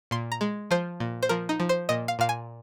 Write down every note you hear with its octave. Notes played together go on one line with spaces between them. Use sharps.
A#2 C6
A#5
G#3
F3 C5
A#2
C5
F3 A#4
D#4
F3
C5
A#2 D#5
F5
A#2 F5
G#5